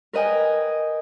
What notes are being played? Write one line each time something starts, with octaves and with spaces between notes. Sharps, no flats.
A#4 B4 D#5 G5 G#5